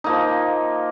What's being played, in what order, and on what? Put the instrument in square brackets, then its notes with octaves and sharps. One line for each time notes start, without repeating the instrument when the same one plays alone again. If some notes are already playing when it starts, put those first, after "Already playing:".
[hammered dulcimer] F3 A#3 D#4